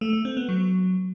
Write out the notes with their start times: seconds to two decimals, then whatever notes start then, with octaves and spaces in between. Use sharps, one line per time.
0.01 A3
0.13 A3
0.25 C4
0.37 B3
0.49 F#3